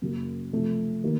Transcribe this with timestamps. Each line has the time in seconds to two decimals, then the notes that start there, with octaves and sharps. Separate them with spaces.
0.02 F#2 C#3 F#3 A#3
0.52 C3 F3 A3
1.04 D#3 A#3